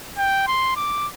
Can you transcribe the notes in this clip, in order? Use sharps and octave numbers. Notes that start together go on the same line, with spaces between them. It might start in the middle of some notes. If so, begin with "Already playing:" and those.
G5
C6
D6